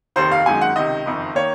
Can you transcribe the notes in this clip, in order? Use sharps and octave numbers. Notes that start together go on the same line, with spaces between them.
F1 D#2 D#3 C5
F5
G#1 F#2 D#3 G#3 G#5
F#5
C#2 C3 D#3 D#5
F#1 F2 D#3
D#3 A#3 C#5